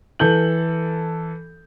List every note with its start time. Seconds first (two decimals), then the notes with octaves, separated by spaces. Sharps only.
0.19 E3 A4 G6 F#7